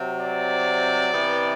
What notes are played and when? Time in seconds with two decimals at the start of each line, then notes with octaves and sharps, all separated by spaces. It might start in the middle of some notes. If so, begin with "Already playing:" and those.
Already playing: C3 F#3 C4
0.21 D5
1.12 C3 E3 B3